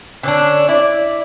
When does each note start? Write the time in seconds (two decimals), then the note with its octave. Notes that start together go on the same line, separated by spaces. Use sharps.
0.23 D3 C#4 D4
0.68 E4 D5